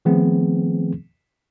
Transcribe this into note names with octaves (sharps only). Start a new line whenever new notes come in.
D#3 F3 A3 B3 C4 G#4